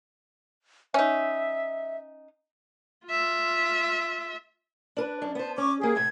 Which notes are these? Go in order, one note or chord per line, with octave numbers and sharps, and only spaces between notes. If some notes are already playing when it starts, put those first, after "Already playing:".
C#4 D#4 E5
F4 E5
D4 A#4 B4
F#2 D4
B3 C5 A5
C#4 C#6 D6
A#3 G4 G#4
A2 C3 A3 G#6